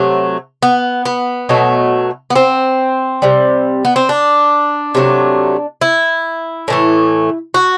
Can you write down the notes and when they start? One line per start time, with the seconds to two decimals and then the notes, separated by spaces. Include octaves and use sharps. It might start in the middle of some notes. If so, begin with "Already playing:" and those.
Already playing: C3 F#3 A3
0.63 B3
1.05 B3
1.49 B2 F#3 A3
2.30 B3
2.36 C4
3.22 C3 G3
3.85 B3
3.96 C4
4.09 D4
4.95 C3 F#3 A3
5.81 E4
6.68 A2 E3 A3
7.54 F#4